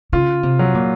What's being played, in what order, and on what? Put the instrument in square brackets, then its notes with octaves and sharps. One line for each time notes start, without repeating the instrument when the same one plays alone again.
[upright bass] C#3 [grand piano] F4
[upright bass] C3
[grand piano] F#3
[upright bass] A#2